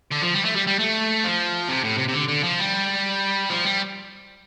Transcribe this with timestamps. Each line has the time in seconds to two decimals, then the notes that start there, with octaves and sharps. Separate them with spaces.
0.11 D3
0.22 F3
0.34 G3
0.45 A3
0.55 G3
0.67 G3
0.79 A3
1.24 F3
1.69 C3
1.84 A2
1.99 C3
2.09 C3
2.14 D3
2.29 D3
2.44 F3
2.59 G3
3.50 F3
3.65 G3